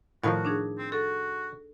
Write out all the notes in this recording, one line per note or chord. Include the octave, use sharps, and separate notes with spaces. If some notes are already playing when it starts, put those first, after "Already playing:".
A2 D#3 F3 F#4 F5 A5 C#6
D4 D#4 G#4
C4
F#4 A4